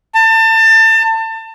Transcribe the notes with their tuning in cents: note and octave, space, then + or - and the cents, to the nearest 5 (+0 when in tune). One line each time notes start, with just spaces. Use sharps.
A5 +30